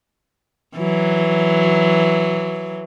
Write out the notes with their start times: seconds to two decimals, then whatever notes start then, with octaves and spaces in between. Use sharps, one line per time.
0.77 E3 F#3